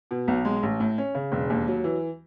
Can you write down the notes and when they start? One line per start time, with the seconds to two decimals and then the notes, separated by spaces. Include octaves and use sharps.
0.11 B2
0.28 B1
0.45 G#3
0.63 A1
0.80 A2
0.98 C#4
1.15 C#3
1.32 E1
1.50 D#2
1.68 F#3
1.84 E3